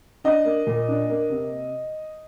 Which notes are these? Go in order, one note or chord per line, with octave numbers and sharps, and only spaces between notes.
D4 D#5
A#3
A#2
D4
A#3
C3